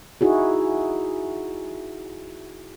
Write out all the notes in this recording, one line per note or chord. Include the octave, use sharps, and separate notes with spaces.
D#4 E4 F#4 G#4